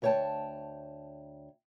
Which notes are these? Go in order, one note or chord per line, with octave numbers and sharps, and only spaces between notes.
D2 B4 C#5 E5 G5 A5